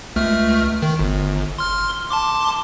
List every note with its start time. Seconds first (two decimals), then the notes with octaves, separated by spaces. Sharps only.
0.16 C#2 A3 F6
0.82 D#3
0.99 G1
1.59 C6 F6
2.10 A5 C6 D6